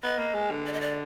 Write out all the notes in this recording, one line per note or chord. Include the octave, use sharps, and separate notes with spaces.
B3 D#5
A#3
G#3
D3
D5
D#5
D5